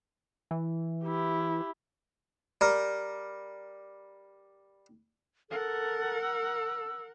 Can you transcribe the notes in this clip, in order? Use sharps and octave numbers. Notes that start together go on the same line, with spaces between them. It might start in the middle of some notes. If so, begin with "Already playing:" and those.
E3
E4 G4
G3 A#4
A4 A#4 F#5
E6